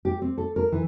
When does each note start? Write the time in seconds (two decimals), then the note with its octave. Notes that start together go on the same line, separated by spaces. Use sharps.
0.05 G4
0.22 C4
0.38 A4
0.56 A#4
0.72 E3